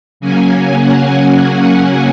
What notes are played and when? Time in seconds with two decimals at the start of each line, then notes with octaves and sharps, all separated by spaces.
0.20 C#3 F#3 A#3 C#4 G#5
0.79 F#5